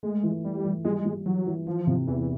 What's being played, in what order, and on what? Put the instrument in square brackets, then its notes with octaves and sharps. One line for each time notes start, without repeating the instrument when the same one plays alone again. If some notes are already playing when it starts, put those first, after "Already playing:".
[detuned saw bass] G#3 [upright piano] A3
[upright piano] E3
[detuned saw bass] G3 [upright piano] A3
[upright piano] E3
[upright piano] G3 [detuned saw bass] G#3
[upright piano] G3
[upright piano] E3 [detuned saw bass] F#3
[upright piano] E3
[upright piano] E3 [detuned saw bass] F3
[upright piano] C3
[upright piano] E2 [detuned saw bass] E3